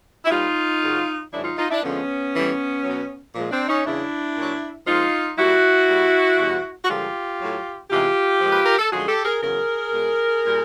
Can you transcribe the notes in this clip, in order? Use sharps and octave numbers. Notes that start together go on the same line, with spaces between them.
E4
A#2 G3 D#4 F4
F#2 C#3 F#3
G#2 D#3 F#3 D4 E4
D#4 F4
D#4 F4
D4 E4
F2 D3 F3 G#3 B3 C#4
A2 E3 G3
B2 F#3
A#2 F3 G#3
C4 D4
C#4 D#4
E2 C#3 F#3 D4 E4
A#2 F#3
A#2 F3 G#3 D#4 F4
A#2 G3 E4 F#4
A#2 G3
E2 B2 G3
F#4
G2 D3 F3 G#3 F4 G4
A2 F#3
E2 C3 E3 G#3 F4 G4
A#2 F3 G#3
B4
A#4
A4
F#2 D3 F3 G#3 F#4 G#4
G4 A4
G#4 A#4
E2 C#3 F#3 G#4 A#4
B2 G#3
A#2 G3